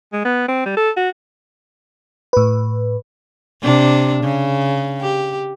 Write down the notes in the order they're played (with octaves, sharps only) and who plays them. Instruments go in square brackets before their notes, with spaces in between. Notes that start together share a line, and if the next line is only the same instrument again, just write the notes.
[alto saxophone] G#3
B3
C4
G3
A4
F#4
[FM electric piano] A2 B4
[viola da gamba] C3 D4
C#3
G4